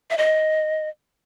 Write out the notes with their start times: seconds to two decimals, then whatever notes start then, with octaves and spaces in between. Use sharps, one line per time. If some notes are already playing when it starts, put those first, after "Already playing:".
0.10 E5
0.18 D#5